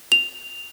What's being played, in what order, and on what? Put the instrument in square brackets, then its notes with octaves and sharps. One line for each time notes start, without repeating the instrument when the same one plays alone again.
[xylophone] F7